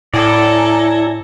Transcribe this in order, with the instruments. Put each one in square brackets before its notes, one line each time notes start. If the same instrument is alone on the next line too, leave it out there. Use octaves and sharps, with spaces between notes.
[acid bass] A2 [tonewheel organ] E4 G#5 A#5 [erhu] A4 [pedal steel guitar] D5